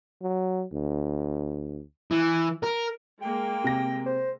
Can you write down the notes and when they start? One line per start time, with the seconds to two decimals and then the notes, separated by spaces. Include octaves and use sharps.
0.22 F#3
0.72 D2
2.11 E3
2.63 A#4
3.22 G#3 A#3 G5
3.64 C3 A#6
4.06 C5